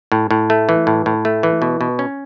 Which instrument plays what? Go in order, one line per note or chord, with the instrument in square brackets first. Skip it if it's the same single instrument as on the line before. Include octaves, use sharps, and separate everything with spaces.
[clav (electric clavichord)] A2
A2
A3
E3
A2
A2
A3
E3
B2
B2
C#4